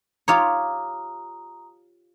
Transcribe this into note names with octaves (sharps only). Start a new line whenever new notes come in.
F4 G4 C#5 A#5 D#6